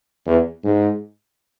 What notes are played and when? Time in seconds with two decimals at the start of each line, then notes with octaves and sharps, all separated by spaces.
0.25 E2
0.64 G#2